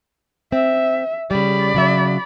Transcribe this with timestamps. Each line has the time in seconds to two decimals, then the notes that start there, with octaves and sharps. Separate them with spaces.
0.52 C4 E5
1.31 C#3 G3 D5 B5
1.74 C#3 F#3 E5